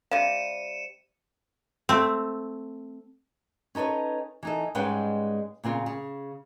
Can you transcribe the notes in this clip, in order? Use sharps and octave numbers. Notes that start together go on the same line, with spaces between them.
C3 G3 F5 C#7 D#7 E7
A3 C4
C#4 D#4 A4 B4 C#5
E3 D#4 A4
G#2 G3 G#3 C#4 B4 G5
A#2 C#3 C4 F4
C#3